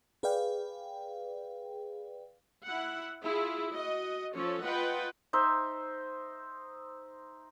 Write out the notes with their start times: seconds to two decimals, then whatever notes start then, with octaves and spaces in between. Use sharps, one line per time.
0.23 G#4 B4 D5 F5 G5
2.66 E4 F#5
3.23 E4 F4 G#4
3.73 F#4 D#5
4.36 F3 C#4 A4 C#5
4.64 F4 B4 D#5 F#5 G5
5.33 D#4 C5 E5